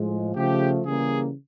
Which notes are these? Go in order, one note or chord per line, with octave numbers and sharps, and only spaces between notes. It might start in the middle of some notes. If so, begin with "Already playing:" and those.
Already playing: A2 F3 G#3
C#3 F3 A3 G4
C#3 E3 G3 A#3 G#4